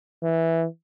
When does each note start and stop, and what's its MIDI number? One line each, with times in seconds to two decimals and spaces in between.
0.23 0.65 52